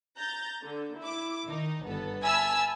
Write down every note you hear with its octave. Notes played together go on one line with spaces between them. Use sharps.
A#5 G6 A6
D3
E4 D6
D#3 D#4
G1 B3 A4
E5 G#5 A5 B5 E6 F6